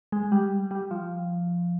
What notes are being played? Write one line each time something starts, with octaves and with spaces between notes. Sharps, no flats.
G#3
G3
G3
F3